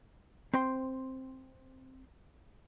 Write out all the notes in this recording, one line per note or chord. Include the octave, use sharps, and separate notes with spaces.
C4 C5 G5 C6